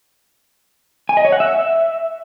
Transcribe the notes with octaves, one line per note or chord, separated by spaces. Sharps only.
G#5
D#5
C#5
F#5
E5